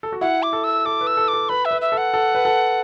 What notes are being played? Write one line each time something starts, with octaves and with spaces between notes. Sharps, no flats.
A4
F#4
E4 F#5
D6
A4
E6
A4 D6
B4
E6
A4
D6
A4
B4 B5
E5
B4
E5
A4
F#5
A4
B4
A4